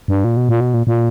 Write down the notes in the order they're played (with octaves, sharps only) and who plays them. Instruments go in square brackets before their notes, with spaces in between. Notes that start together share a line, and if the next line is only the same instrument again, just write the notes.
[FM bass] G2
A#2
B2
A#2
B2
A#2
A#2